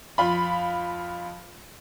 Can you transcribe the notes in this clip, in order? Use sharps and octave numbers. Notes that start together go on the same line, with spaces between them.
F2 F4 B5